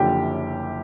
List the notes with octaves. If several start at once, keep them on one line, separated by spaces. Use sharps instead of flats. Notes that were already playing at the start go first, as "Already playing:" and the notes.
Already playing: F#1 F#2 D3 F3 G4